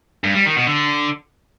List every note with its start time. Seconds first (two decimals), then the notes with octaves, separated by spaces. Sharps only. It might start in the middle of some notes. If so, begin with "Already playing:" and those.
0.24 G2
0.35 G3
0.46 D#3
0.56 B2
0.67 D3